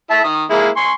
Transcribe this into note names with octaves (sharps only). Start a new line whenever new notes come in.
E4 E5 A5
D#3 D#6
G#3 A#3 E4
G#5 C6 C#6